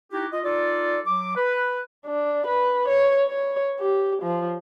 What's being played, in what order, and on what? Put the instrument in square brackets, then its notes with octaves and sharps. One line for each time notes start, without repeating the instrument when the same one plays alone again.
[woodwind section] D#4 E4 F#4 G4
F4 D#5
D#4 F4 A4 D5
F#3 D6
B4
[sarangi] D4
B4
C#5
C#5
G4
F3